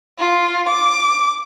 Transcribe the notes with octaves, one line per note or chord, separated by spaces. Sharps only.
F4
D6